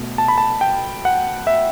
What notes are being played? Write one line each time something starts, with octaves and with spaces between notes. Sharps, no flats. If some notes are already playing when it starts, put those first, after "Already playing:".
Already playing: B2 A3
A5
B5
A5
G5
F#5
E5